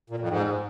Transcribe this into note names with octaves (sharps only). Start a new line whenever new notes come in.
A#2
F2
G#2